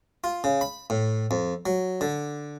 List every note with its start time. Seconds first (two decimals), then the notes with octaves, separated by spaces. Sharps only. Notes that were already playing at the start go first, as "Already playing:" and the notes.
0.24 F4
0.44 C#3
0.61 B5
0.90 A2
1.31 F2
1.66 F#3
2.01 D3